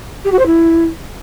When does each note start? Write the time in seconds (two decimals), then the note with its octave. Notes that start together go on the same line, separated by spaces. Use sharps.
0.25 G4
0.32 F#4
0.39 C5
0.46 E4